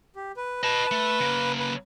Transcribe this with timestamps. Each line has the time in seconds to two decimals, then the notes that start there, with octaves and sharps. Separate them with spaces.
0.16 G4
0.37 B4
0.63 B4 D#5 A5
0.91 A3
1.20 C#3 A#3
1.59 B4